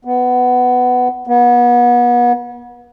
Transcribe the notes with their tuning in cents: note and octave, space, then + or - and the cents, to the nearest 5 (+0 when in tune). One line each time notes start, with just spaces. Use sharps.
B3 +10
B3 -35